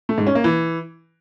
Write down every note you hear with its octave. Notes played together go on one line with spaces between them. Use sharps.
A3
G#2
C#4
A#3
E3